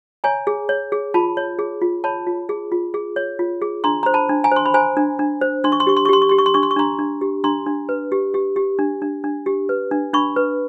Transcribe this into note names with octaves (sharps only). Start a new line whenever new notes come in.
C#5 G#5 A#5
G#4
C#5
G#4
F4 A5 B5
C#5
G#4
F4
C#5 A5 B5
F4
G#4
F4
G#4
C#5
F4
G#4
D4 A#5 C6
C5 A#5
A5 B5
D4
G#5 A#5
C5 C6
B5
C5 G#5 A#5
D4
D4
C5
D4 C6
C#6
C6
G4 C#6
C6
C#6
G4 C6
C#6
G4 C6
C#6
C6
D4 C#6
C6
C#6
D4 A#5 C6
D4
G4
D4 A#5 C6
D4
B4
G4
G4
G4
D4
D4
D4
G4
B4
D4
D4 B5 C#6
B4